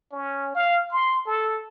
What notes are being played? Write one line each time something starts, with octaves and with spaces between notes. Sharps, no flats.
C#4
F5
C6
A4